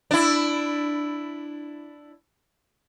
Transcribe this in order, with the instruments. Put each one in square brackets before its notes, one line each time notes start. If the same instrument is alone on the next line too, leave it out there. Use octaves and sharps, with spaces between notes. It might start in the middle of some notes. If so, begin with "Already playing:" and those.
[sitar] D4 E4